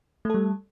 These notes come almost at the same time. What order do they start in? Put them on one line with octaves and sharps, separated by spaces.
A3 A4 G3